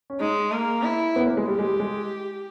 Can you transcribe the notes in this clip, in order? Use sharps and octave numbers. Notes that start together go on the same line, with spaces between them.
C#4
G#3 D#4
A#3
E4
B3
A#3
G#3
G3 G4
G#3
G3
G#3